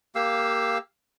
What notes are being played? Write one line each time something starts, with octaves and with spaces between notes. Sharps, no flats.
A#3 G4 F5 E6